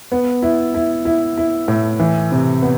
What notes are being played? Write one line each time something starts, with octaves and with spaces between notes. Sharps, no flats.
B3
E4
E4
E4
E4
A2
E3
C3
B3